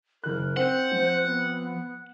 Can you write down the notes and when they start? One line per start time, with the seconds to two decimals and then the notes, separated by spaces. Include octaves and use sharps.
0.24 F#1 A#4 F#6
0.57 C4 C5 F#5
0.92 F3
1.27 B3